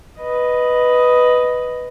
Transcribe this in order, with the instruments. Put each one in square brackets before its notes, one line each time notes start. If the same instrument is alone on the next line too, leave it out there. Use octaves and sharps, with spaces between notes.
[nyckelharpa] B4 D#5